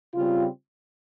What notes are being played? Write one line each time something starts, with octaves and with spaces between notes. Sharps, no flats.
C#3 G3 C4 F4